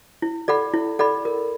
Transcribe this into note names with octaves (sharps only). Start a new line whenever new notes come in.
E4
A4 D5 F#5 B5
E4
A4 D5 F#5 B5
A#4